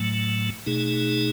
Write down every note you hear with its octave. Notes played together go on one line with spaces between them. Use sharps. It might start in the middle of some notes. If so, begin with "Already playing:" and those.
Already playing: A2 F#3 A3
B2 A3 D#4 G#4